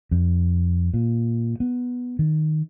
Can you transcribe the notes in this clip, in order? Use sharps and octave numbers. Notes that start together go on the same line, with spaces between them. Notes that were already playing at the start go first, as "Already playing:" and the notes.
F2
A#2
B3
D#3